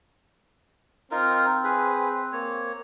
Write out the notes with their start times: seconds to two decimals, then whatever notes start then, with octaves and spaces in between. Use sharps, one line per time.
1.11 C4 D#4 F4 A#4
1.64 G#4 B4
2.33 A#3 C#5